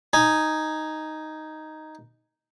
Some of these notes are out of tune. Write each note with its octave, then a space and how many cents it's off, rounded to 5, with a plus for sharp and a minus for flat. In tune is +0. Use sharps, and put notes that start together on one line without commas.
D#4 +0 G#5 +0